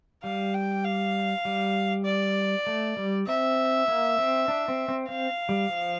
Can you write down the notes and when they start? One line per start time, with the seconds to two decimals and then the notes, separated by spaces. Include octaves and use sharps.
0.24 G3 F5
0.54 G5
0.84 F5
1.45 G3
2.05 D5
2.67 A3
2.97 G3
3.27 C4 E5
3.88 A#3
4.18 C4
4.48 D4
4.68 C4
4.89 C4
5.09 C4 F5
5.49 G3
5.69 F3